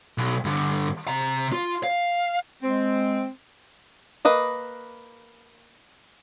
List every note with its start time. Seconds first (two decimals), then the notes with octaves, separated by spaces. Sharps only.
0.18 B1
0.45 G2 D3
1.08 C3 A#5
1.52 F4
1.83 F5
2.62 G#3 C4
4.25 A#3 B4 D#5